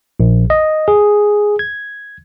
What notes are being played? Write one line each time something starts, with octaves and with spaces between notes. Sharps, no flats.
A#1
D#5
G#4
G#6